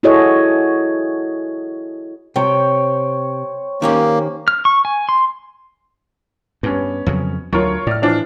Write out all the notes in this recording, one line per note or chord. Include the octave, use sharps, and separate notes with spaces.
E4 F#4 G#4 A4 C#5 D#5
C3 C5 C#5 G5
D#3 A#3 C#4 G4
F6
C#6
G#5
C6
G2 B3 C#4
F2 C#3 F#3
D2 F#3 F4 A#4 C#5
A2 D5 F6
E3 F3 D4